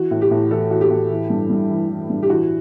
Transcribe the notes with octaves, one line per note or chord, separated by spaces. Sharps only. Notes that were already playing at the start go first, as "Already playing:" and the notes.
Already playing: E3 F#4
A2
G4
A2
E3 A4
E3 F#4
G4
A2
E3
G2
G2
E3
E3
G2
G4
E3 F#4